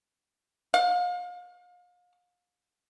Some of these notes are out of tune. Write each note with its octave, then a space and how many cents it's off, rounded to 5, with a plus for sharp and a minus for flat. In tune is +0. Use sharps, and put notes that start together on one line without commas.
F5 +35